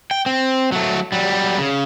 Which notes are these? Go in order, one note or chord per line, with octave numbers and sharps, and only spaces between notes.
G5
C4
F#3 A3
F#3 G3
C#3